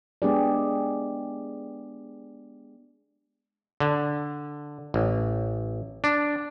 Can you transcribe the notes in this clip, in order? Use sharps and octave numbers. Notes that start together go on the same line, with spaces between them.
G#3 B3 D4 G4 G#4 D5
D3
A1
D4